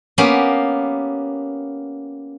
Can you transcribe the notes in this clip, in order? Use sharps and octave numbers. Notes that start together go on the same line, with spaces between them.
A#3 B3 C#4 G4